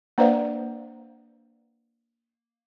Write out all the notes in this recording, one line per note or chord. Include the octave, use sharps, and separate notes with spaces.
A#3 D4 B4 C5 D5 F5